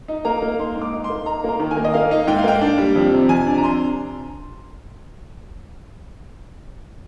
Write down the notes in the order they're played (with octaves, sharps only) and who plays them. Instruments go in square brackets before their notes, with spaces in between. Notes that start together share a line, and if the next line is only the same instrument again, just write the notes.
[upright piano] D#4
A#3 A#5
A#3
D#4 C6
G#2
D6
D#4
C6
A#3
D#4 A#5
A#3 A#5
D#3
G#5
A#3
D#5
A#3 F5
D#4
G#2 G5
F5
A#3 G5
D4
G3
F2
C3
F2 G#5
D4
A#5
C3 C6